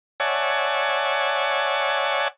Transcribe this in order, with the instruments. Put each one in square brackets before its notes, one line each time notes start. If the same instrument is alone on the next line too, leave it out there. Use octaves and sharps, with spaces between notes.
[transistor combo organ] C#5 D5 E5 F#5 G#5 A5